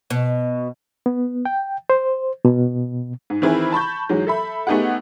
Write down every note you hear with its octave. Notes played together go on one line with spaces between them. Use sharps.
B2
B3
G5
C5
B2
G#2
D#3 E3 C4 E4 G#4 B4
A5 B5 C#6 G6
G#2 E3 F#3 G#3
A4 E5 B5
A3 B3 D#4 G4 G#4 F#5